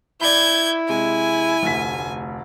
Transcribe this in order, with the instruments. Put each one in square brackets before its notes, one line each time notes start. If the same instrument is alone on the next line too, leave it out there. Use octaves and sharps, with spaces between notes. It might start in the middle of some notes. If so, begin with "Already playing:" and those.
[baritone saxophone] E4 [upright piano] D5 B5 [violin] G6 G#6
[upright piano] C3 G#3 [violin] G#5
[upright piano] F1 D2 B6